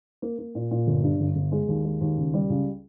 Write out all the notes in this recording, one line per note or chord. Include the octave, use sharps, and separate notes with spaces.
A#3
A#3
A#2
A#2
G1
G2
G1
G1
G#3
D#2
G#3
D#2
C#2
G3
C#2